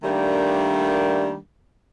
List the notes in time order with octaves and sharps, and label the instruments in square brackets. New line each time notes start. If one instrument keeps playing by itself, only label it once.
[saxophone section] D#3 G3 A3 A#3 D4